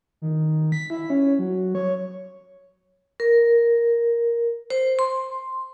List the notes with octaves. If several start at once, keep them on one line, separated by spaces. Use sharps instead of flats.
D#3
B6
E4
C#4
F#3
C#5
A#4
C5
C6